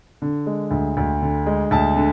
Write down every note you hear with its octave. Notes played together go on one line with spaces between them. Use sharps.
D3
G#3
D2
D2
D3
G#3
D2 A5
D3